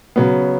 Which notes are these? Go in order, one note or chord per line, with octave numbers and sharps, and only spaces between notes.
C#3 F#3 B3